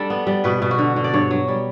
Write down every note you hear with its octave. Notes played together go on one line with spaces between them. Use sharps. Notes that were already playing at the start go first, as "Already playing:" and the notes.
Already playing: G3 D4 A4
B3
G3
B2 B4
B2
F#4
D3
D3
D5
G2 C#5
F#3
G3